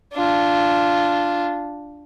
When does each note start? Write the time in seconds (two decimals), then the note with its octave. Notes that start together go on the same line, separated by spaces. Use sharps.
0.13 D4 F4